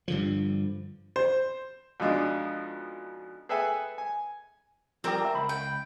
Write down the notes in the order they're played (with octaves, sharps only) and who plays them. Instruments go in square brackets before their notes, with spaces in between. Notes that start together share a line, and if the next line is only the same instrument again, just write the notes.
[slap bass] G2 D3 F3
[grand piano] C5
[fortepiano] F2 B2 G#3 D4 D#4
G#4 A4 B4 E5 G5 G#5
G#5
[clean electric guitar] F3 G3 G4 [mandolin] C4 A#4
[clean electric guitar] A4 E5
C#2 B5
[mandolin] G5